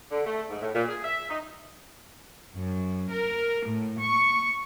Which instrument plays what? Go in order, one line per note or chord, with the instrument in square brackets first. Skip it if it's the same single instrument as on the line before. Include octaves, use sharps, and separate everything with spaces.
[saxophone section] D3
A3
G#2
A2
A#2
G#4
E5
D#4
[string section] F#2
A#4
A2
C#6